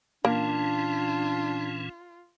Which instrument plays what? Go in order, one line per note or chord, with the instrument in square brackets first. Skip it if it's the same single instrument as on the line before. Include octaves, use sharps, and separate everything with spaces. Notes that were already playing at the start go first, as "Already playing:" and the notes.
[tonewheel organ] A#2 E3 C#4 [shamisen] A#3 [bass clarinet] D4 [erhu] F4